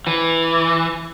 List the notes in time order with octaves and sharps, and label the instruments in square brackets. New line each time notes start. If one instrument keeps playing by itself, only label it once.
[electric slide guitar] E3